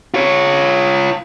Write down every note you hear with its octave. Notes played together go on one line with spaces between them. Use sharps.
F4 C#5